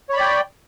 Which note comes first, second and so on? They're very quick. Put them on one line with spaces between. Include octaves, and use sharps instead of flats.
C#5 B5 D5 G5